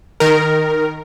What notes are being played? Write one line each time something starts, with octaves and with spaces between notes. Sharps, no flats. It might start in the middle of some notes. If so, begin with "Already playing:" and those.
D#3 A#4